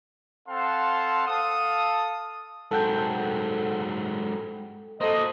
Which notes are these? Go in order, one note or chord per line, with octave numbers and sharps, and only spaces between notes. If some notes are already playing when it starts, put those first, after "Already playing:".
C4 A4 F5 F#5 A5 C6
A4 F5 D#6
G#2 F#3 A4 F#5 G5
A#3 F#4 A4 C5 D#5